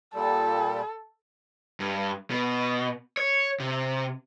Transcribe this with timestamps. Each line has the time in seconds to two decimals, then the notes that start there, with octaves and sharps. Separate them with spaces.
0.15 A#2 G3 A4
1.80 G2
2.30 B2
3.17 C#5
3.60 C3